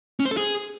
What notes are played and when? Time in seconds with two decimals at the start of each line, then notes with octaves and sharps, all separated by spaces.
0.20 C#4
0.25 C5
0.31 A4
0.37 G#4